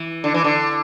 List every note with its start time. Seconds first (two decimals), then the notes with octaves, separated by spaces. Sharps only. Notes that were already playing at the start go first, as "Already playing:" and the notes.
Already playing: E3
0.24 D3
0.34 E3
0.44 D3